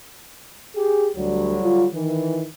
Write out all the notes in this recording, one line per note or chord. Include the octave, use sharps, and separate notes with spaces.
G4 G#4
D2 D3 F#3 G3
F4
D#3 E3